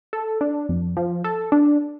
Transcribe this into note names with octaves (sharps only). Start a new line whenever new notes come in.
A4
D4
F2
F3
A4
D4